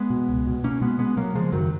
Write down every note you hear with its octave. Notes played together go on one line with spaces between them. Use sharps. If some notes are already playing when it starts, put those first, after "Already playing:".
Already playing: G#3 B3
B2
C#2
B2
B2 A#3 C#4
B2 G#3 B3
B2 G#3 B3
B2 F#3 A#3
C#3 F3 G#3
F#2 D#3 F#3